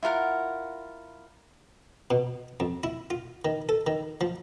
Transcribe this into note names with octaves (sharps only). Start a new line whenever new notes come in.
E4 F4 A#4 F#5
B2
F2
E4
F4
D#3
A4
D#3
F3